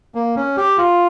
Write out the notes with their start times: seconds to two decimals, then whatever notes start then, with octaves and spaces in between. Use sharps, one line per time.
0.15 A#3
0.36 C#4
0.57 G4
0.78 F4